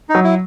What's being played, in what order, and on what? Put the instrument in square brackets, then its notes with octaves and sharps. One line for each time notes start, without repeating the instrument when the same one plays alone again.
[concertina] D#4
[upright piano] F#3
[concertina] E4